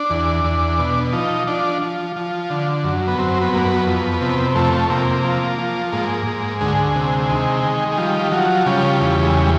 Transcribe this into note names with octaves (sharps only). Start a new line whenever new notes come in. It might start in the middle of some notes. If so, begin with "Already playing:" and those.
Already playing: D4
E2
E2
B2
F3 D#4
F3 D4
F3
F3
D3
F#2
B3
F#2 C4
B3
F#2 A#3
B3
F2
C3
F2 A3
C3 A#3
F3
F3
G#2 A#3
G#2
D2 G#3
C3
D#3
D#3
G#3
F3 G3
F3 F#3
C#3 G3
E2
G#3
G3